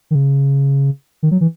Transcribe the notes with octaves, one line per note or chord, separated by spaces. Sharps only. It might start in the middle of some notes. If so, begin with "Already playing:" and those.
D#3
C#3
D#3
F#3
E3